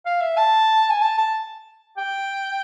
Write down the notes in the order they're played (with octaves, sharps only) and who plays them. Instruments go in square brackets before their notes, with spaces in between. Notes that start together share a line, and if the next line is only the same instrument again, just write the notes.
[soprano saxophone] F5
E5
A5
G#5
A5
A5
G5